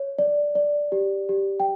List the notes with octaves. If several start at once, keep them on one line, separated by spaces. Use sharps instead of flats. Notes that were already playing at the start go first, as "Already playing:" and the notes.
Already playing: C#5
D5
D5
G4
G4
G5